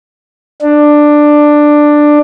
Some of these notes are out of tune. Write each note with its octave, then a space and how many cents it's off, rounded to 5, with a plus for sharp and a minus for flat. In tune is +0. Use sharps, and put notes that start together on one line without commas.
D4 +10